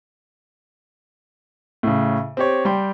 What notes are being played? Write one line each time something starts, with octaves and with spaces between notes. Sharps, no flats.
A2 C#3
C4 G4 C#5
G3 G5 C6